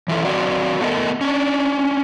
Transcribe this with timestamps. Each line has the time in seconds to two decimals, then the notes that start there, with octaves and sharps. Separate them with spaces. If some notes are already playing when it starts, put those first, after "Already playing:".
0.08 E3 E4 F4 A4
0.25 F#3 C4 F4 F#4 D5
0.81 A3 B3 A4 A#4 D#5
1.21 C#4 D4